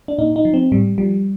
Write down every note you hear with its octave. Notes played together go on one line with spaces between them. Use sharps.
D4
A#2 D#4
D#4
F3
C4
A2 G3
F3 G3